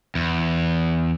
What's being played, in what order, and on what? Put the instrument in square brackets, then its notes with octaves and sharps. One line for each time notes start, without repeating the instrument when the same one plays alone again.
[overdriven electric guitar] E2